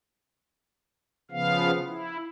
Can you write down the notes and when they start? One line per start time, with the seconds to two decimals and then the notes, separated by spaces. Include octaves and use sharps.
1.31 C#3 F3 B3 F5
1.87 E4